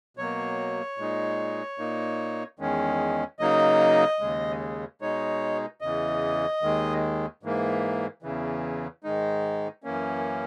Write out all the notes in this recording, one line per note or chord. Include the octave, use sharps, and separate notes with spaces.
B2 F#3 A#3 C#5
A#2 G#3 D#4
A#2 A#3 D#4
E2 D#3 G#3 C#4
C#3 F#3 A#3 D#4 D#5
D#2 C#3 G#3
B2 G#3 D#4 C#5
E2 C#3 E3 D#5
D#2 D#3 G#3
G#2 E3 A#3
E2 C#3 E3
G#2 D#3 G#3 D#4
F#2 E3 A#3 C#4